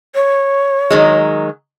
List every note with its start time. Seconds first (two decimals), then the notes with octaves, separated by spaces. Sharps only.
0.15 C#5
0.90 D#3 F#3 G#3